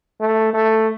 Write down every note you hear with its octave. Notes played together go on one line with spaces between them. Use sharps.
A3
A3